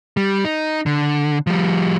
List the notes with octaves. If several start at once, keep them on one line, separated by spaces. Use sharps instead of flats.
G3
D#4
D3
F3 G3